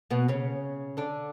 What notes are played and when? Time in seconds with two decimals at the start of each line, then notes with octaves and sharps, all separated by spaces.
0.10 B2 B3
0.28 C#3 C#4
0.97 D3 D4